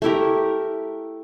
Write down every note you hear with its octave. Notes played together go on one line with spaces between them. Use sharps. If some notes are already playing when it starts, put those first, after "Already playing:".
A3 E4 G4 A#4